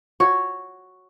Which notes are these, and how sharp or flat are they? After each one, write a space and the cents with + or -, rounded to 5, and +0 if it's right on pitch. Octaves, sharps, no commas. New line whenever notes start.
F#4 +0 C#5 +0